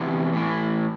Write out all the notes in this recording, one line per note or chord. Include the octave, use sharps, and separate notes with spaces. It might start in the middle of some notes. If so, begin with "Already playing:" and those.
Already playing: E2 C3 E3
A2 E3